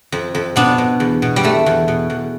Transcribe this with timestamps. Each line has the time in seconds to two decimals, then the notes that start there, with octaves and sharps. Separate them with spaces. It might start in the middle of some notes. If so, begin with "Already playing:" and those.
0.12 F2
0.35 F2
0.56 B2 B3 D4
0.78 B2
1.00 E2
1.22 B2
1.36 G3
1.43 E2 A3
1.66 E2
1.88 B2
2.10 E2